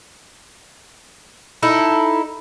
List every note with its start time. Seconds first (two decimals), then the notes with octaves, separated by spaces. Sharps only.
1.63 D#4 E4 A4